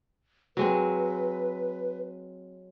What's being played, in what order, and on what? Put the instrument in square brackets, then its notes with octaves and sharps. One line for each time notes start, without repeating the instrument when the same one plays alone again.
[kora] F#3 G#3 C4 [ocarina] B4